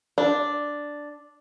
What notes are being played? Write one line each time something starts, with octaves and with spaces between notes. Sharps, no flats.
D4